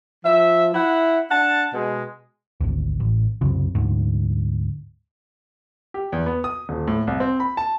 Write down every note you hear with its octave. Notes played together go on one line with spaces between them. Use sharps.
F3 E5
E4 F#5
D4 F#5 A5
B2 G#3
G#1 D2
A1
C2 F#2 C#3
D2 G#2
G4
E2
B3
D#6
D#1
A2
C2
C4
B5
A5